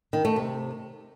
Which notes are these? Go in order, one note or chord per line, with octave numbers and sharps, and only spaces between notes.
D#3
A3
C3